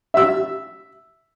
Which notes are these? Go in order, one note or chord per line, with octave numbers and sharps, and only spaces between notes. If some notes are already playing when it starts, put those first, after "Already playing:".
E5 E6